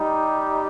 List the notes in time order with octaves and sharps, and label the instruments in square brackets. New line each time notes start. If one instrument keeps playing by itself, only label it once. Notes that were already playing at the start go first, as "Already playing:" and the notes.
Already playing: [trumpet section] G3 D#4 G4